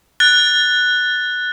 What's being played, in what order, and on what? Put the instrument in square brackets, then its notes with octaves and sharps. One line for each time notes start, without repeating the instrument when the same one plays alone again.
[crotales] F#6 A6